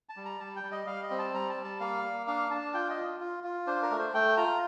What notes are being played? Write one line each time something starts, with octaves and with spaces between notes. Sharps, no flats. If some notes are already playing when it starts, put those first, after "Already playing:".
A5
G3
A#5
G3 A5
G5
G3
D#5
G3 F5
D#5
C4
A5
G3 A#5
A5
G3
A5
A#3 F5
A#3
D4 F5
D4 A5
F4 G5
D#5
F4
F4
F4
D4 C5
A#4
A3
C5
A3 G5
F4 A#5